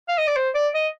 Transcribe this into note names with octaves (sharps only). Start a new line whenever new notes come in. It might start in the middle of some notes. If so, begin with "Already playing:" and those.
F5
D#5
D5
C5
D5
D#5